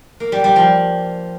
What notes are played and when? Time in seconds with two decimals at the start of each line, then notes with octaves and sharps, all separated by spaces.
0.20 A#3
0.32 G3
0.44 G3
0.56 F3